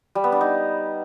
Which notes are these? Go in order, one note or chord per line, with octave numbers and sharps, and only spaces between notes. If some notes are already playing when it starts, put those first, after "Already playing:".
G3
B3
D4
D#4